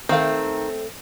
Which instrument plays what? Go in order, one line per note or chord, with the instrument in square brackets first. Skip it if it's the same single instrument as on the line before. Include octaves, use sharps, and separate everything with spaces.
[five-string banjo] D#3 F5 [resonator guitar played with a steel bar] A3 C4